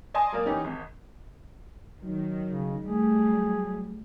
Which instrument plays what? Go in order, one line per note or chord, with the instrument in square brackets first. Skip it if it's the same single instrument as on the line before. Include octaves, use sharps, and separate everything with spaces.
[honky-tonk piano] D5 D#5 G#5 A5 C6 D#6
F#3 A#3 A#4 D5
E3 C#4 D#4 G4
G#1
[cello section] D#3 [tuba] F#3
[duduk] C#3
[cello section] G3 A3 [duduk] G#4
[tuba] F#3